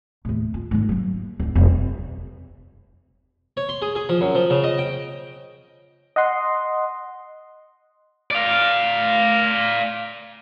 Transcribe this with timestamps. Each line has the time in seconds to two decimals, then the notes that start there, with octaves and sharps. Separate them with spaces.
0.25 D#2 A2
0.54 F4
0.71 G#2 D#3
0.89 F#3 A#3
1.39 D1 E4
1.55 E1
3.57 C#5
3.69 C6
3.82 G#4
3.95 G#4
4.09 F3
4.21 F#2
4.35 F3
4.50 C#3
4.64 D#5
4.78 G5
6.16 D#5 F#5 C6
8.31 D5 F5